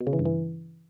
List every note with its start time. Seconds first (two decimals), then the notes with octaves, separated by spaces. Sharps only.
0.01 B2
0.07 C#3
0.13 E3
0.19 G2
0.25 E3